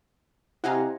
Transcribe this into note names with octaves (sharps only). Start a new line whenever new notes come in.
C3 E4 D#5 F5 F#5 G#5 A#5